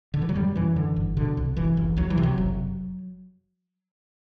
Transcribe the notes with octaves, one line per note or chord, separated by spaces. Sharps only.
D3
E3
F#3
F#2 G3
F#2 E3
D3
G1
B2 D3
C2
F#1 E3
F#1
C2 F#3
E3
C3
F#3
F#1